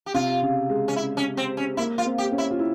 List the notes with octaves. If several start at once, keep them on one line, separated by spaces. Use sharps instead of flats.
G4
C3 F4
C#3
G#3
C#4
E4
C#4
C4
C#4
A#3 E4
F4
C4
G4
C#4
E4
F4
E4